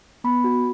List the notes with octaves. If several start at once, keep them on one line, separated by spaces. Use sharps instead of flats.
B3 B5
F#4